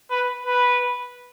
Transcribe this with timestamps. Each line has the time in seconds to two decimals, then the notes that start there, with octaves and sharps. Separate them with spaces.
0.10 B4
0.46 B4